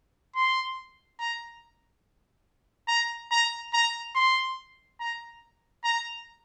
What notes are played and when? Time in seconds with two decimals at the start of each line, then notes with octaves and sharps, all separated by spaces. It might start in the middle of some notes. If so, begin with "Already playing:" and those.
0.36 C6
1.20 A#5
2.88 A#5
3.31 A#5
3.74 A#5
4.15 C6
5.00 A#5
5.84 A#5